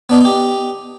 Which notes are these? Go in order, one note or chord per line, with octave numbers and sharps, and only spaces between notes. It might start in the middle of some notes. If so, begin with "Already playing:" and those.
B3 D4 D#4
D#4 G4